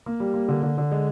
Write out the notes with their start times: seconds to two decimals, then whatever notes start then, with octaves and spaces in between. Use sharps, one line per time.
0.06 A#3
0.20 G3
0.34 A#3
0.48 D3
0.63 D3
0.78 D3
0.91 G#3